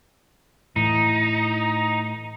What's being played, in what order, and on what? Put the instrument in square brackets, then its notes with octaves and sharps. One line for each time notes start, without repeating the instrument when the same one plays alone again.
[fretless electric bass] A2 E3 [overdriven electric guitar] D#4